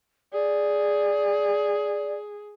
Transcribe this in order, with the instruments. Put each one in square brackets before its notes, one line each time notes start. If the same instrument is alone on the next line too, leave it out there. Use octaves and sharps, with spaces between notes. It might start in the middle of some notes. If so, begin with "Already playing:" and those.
[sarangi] G#4 [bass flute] D5